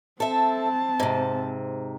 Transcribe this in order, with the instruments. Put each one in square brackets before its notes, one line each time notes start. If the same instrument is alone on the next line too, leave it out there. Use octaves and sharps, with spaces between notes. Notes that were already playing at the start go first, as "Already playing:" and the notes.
[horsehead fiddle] C4 A5 [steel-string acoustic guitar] A4 E5
[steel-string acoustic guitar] G#2 C3